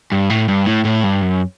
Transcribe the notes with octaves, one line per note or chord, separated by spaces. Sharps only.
G2
A2
G2
A2
A2
G2
F#2